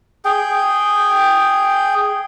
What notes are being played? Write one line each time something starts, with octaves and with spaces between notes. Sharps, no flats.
G#4 G5